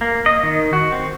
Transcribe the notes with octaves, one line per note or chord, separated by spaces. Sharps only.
A#3
D#5
D#3
F#4
C4